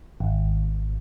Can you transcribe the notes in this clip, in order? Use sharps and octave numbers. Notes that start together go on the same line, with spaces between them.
G#1